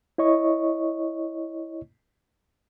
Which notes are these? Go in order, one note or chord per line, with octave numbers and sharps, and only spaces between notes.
E4 C#5 D#5 C#6